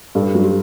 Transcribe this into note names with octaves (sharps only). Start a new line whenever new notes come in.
G2 A4
G4
F#3 F#4
G4